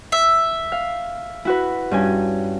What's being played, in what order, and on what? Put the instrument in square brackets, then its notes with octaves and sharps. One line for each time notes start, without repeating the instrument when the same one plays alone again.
[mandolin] E5
[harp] F5
E4 F#4 B4
G2 C#4 G#5